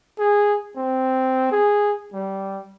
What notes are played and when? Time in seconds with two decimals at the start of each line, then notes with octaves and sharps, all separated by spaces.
0.19 G#4
0.77 C4
1.51 G#4
2.14 G3